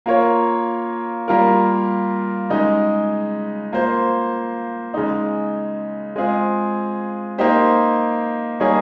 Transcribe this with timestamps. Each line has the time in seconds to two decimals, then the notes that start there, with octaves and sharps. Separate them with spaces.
0.06 A#3 F4 A#4 C#5
1.28 G3 A#3 F4 A#4
2.50 C#3 G#3 D#4
3.73 A#3 F4 C5
4.94 C#3 G#3 D#4
6.16 G#3 C4 F4 G#4
7.38 A#3 D#4 G4 C5
8.60 G3 A#3 D#4 G#4 C#5